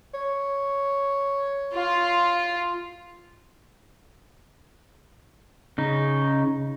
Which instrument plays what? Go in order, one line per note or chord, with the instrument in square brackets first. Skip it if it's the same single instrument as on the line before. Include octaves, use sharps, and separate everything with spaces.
[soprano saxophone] C#5
[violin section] F4
[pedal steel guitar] C#3 D#4